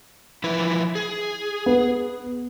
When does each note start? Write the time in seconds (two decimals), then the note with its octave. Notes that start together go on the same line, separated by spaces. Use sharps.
0.44 F3 E4 B4
0.95 G#4
1.66 B3